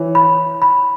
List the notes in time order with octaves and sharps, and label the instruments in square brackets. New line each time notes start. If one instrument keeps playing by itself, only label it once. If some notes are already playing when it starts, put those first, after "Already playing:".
Already playing: [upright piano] E3 [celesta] C#5
[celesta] B5
B5